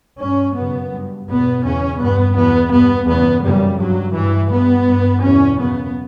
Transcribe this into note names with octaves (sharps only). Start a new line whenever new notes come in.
G2 C#4
F#2 C#3 B3
G2
E2 B2 B3
E2 C#3 C#4
G2 B3
E2 B2 B3
G2 B3
E2 C#3 B3
F#2 C#3 G3
G2 F#3
G2 E3
G2 B3
G2
E2 B2 C#4
F#2 C#3 B3